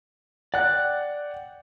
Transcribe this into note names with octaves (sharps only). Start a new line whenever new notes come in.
D5 F#5 G5 F#6